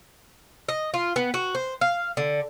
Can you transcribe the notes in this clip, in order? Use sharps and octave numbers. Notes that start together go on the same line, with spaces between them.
D#5
F4
B3
F#4
C5
F5
D3